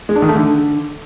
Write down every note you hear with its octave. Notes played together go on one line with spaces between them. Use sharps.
G#3
D4
D#3
A3
D3